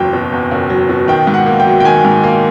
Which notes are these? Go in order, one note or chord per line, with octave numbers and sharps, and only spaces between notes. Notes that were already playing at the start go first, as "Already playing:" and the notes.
Already playing: F#1 E2 F#3 G5
B2
E2
F#1
F#3
B2
D#3 G5
G#2
F#5
A#3
G5
F#3
G5
D#3 G#5
G#2
A#3